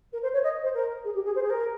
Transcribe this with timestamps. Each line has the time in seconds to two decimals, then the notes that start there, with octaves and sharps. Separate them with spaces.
0.12 A#4
0.22 C5
0.33 C#5
0.43 D#5
0.63 C5
0.74 A#4
1.04 G#4
1.14 G4
1.24 G#4
1.35 C5
1.42 G#4
1.50 A#4